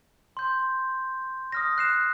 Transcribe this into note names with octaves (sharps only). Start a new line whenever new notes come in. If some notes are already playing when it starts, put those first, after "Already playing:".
C6 G6
D#6 F6 A#6
F#6 C7 E7